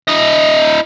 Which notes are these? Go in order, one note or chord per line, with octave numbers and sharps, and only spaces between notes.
E4 D#5